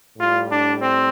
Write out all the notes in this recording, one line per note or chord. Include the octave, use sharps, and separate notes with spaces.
A2 G3 F4
D4
C4